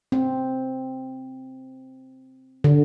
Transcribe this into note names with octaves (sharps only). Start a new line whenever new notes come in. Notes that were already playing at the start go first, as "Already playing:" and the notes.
C4
D3